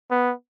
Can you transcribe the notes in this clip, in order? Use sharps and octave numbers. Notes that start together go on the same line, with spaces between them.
B3